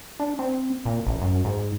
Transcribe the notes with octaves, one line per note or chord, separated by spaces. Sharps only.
D4
C4
A#2
A1
F#2
G#2